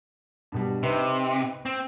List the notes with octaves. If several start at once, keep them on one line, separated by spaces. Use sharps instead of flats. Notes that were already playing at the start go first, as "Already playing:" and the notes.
G2 B2 G3
C3 C4 D#4 B4
C4